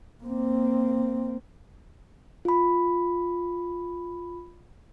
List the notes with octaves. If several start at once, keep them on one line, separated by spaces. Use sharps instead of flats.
A#3 C4
F4 B5